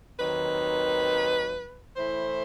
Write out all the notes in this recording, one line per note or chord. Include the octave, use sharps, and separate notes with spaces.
D#2 D#3 F#3 C4 D#4 B4
A2 E3 A3 E4 C5